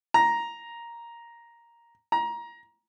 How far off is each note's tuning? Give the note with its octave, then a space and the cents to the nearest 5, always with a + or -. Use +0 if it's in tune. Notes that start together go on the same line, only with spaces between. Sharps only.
A#5 +5
A#5 +20